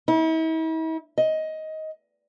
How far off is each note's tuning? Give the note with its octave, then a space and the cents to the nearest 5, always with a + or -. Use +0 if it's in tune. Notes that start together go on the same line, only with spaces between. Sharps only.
E4 -45
D#5 +15